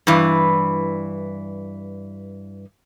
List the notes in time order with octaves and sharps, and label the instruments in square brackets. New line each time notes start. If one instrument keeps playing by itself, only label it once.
[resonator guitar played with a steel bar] G2 E3